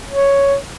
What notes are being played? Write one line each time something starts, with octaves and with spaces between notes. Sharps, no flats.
C#5